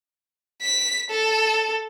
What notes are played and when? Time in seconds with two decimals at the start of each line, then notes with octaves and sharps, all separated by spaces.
0.62 B6
1.10 A4